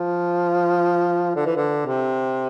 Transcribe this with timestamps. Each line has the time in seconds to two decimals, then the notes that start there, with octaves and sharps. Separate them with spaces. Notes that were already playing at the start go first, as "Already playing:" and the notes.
Already playing: F3
1.36 D3
1.46 E3
1.56 D3
1.86 C3